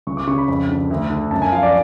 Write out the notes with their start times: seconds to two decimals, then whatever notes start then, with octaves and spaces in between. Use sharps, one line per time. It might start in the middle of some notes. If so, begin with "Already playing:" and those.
0.07 C#2 C#6
0.17 D6
0.27 C#3 C#6
0.38 B5
0.48 F2 B5
0.69 D3
0.90 D2
1.10 D3
1.31 F#2 A5
1.42 G#5
1.52 F3 F5
1.63 D5